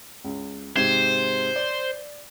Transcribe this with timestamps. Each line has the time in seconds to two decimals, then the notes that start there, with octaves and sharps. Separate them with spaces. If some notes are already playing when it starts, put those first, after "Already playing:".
0.24 C#2
0.76 G#2 C3 C5 G#6
1.56 D5